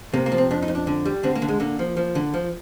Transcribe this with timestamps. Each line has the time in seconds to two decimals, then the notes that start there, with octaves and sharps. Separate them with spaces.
0.13 C3 A#3
0.26 A#3
0.32 F3
0.38 C4
0.51 F2 D4
0.62 D#4
0.68 F2
0.75 D4
0.87 D3
1.05 G3
1.23 D3 C4
1.35 A#3
1.42 D3
1.48 G#3
1.60 D3 A#3
1.79 F3
1.97 F3
2.15 D3
2.34 F3